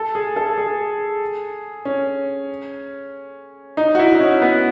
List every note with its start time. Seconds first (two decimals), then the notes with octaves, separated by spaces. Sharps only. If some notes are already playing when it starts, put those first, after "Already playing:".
Already playing: A4
0.15 G#4
0.36 A4
0.58 G#4
1.85 C#4
3.77 D#4
3.95 F#4
3.99 E4
4.15 D#4
4.20 C#4
4.42 B3